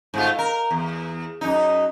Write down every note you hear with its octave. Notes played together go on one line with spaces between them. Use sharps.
G#2 A3 F4
A#4
E2
F#2 D#4